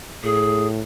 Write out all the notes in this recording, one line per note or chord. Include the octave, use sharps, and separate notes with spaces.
A2 G#4